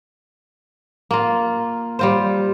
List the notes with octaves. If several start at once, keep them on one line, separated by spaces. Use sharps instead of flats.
A#3 F4
G3 F4 C5